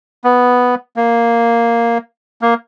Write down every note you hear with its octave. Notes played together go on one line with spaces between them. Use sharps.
B3
A#3
A#3